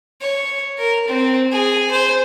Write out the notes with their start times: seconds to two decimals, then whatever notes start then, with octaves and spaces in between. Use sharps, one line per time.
0.22 C#5
0.78 A#4
1.08 C4
1.52 G#4
1.91 C5